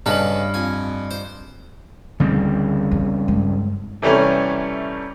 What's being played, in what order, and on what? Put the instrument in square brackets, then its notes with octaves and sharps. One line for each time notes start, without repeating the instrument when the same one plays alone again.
[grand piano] G2 D#5 F#7 [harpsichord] C#3 A4 B4
[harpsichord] F2 G#5
C5
[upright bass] D2 [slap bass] C#3 G3 C4
[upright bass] E2
G2 G#3
[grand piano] C3 E3 G3 A3 C#4